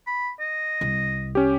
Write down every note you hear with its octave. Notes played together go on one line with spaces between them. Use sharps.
B5
D#5
C2
C#4 G4